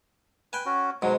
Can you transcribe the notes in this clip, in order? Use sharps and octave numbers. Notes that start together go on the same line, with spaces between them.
B4 G5 G#5
C#4 F#4
G#2 B2 F#3